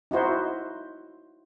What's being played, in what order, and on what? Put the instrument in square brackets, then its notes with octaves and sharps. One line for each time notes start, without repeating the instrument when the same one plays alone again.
[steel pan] D#4 E4 F#4 C5